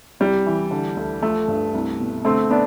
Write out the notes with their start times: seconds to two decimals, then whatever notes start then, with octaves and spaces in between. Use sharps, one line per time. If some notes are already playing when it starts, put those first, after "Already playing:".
0.20 C2 G3
0.46 E3
0.71 D3
0.97 D2
1.22 F3 A3
1.48 G2
1.75 C2
1.99 B2
2.25 D3 A3 C4
2.50 B3 D4